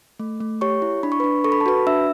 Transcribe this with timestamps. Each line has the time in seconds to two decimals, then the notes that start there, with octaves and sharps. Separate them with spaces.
0.20 A3
0.40 A3
0.61 G4 C#5 C#6
0.82 E4
1.03 D4 B5
1.12 C#6
1.20 D4 B4 B5
1.44 A4 C#6
1.52 B5
1.61 A5
1.66 F#4 B4 B5
1.87 D4 E5 E6